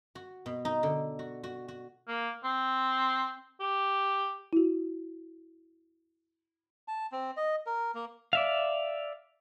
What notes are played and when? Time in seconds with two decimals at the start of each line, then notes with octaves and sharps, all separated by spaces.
0.15 F#4
0.46 B2
0.65 D#4
0.83 D3
1.19 F#4
1.44 F#4
1.68 F#4
2.08 A#3
2.44 C4
3.60 G4
4.53 E4 F#4
6.88 A5
7.12 C4
7.37 D#5
7.66 A#4
7.95 A#3
8.33 D5 E5 F5